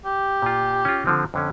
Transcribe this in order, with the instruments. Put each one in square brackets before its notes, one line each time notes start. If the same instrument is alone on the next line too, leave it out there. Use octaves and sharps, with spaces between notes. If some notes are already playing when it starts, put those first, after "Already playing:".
[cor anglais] G4
[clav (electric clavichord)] A#2 F4
C#4 F4
D3 F3 C4
F2 D3 C#4